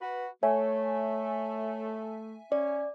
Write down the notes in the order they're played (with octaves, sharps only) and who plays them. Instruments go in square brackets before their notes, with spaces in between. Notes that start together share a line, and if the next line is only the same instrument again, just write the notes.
[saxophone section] F#4 B4
[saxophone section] A3 [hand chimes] C#5 [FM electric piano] E5 G#5
[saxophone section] C#4 [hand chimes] D5